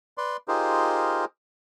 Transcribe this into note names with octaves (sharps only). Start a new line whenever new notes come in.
B4 D5 C6
D#4 F4 G4 G#4 A#4 C5